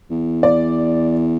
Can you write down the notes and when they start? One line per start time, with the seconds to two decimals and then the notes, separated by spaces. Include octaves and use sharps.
0.11 E2
0.43 D5